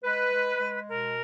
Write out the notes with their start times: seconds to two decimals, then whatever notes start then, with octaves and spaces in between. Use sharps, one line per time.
0.03 G#3 B4
0.32 G#3
0.60 G#3
0.88 B2 A#4